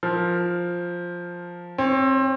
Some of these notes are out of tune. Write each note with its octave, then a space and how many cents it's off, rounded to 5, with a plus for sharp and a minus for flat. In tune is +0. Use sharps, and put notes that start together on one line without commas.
F3 +5 A#4 +0
C4 +25 C#5 +0